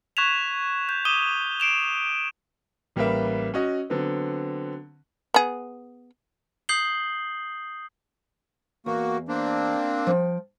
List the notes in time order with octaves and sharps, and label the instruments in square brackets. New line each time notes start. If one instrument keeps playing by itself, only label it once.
[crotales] C#6 F#6 G#6 B6 E7 F7
G6
D6 D#6 D#7 E7 G7
C7 D7 E7 F7
[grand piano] A1 G3 A#3 A#4 B4 E5
C#4 F#4 D#5
D3 F#3 B3 C4
[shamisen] B3 G#4
[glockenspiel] D#6 G6 C7 F#7 G7
[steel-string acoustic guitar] E2 [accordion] A#3 F#4
[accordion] A#3 C4 D4
[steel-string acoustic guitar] F3 G5